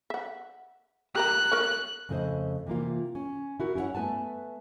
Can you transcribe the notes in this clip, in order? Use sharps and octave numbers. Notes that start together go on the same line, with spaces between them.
E5 F#5
G4 A#4 A#5 F#6
A#4 C#5
F2 C#3 A3 G#4 C5 D#5
C3 E3 A#3 F4
C#4
E4 F#4 A#4
C#4 E4 G4 C#5 F#5
A3 B3 B4 G#5 A5